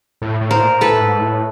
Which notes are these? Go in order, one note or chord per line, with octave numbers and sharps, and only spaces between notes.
A2
A2
A#4 C5
A#2
A2 A4 B4
A2
G#2
A2